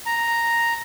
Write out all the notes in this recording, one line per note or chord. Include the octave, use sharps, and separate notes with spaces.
A#5